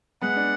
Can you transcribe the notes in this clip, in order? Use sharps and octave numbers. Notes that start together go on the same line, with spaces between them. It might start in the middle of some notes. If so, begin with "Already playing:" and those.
G#3 B3 F#5
D4